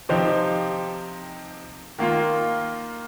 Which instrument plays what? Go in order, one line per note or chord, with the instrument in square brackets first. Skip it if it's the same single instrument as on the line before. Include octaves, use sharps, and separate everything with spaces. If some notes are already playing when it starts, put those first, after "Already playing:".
[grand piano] C3 F3 C4 D#4 G4
D#3 A#3 F4